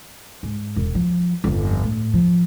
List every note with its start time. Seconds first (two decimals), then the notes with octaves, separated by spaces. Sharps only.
0.43 G#2
0.76 E1
0.95 F3
1.44 G1 F2
1.84 A2
2.14 F3